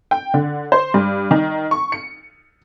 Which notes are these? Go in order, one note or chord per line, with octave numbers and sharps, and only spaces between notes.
G5
D3
C5
G2
D#3
C#6
C#7